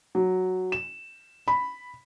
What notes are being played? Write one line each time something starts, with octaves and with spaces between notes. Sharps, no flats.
F#3
E7
B5